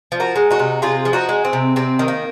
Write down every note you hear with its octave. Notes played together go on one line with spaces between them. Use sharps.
F3
F#4 A#4
G#3
D#4 F#4
C3
C3 F4 G#4
F3
D#4 F#4
G#3
C4
C3
C3 C4
D#3
A#3